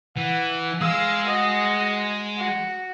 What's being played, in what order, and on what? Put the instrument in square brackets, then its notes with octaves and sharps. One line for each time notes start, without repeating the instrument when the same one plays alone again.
[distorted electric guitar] E3 [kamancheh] F#5
[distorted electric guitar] G#3 G#4 [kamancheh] F5 E6
[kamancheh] F#4 D#5
F#4